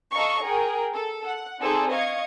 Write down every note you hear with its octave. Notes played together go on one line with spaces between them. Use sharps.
A4 D#5 F5 A#5 C#6
G#4 A#4 G5
A4
F#5
C4 D#4 G#4 A4 C5 D5
D#5 F5 C#6 G#6 C#7